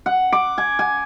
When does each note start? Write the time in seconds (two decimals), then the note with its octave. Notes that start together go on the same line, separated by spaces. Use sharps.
0.06 F#5
0.33 D6
0.58 G#5
0.79 G#5